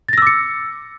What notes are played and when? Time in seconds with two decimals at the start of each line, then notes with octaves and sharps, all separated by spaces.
0.08 A6
0.13 A#6
0.18 E6
0.22 D6
0.27 C#7